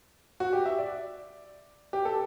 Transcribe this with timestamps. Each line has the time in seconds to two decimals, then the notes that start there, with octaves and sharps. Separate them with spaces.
0.40 F#4
0.53 G4
0.66 E5
0.78 D5
1.93 G4
2.05 A4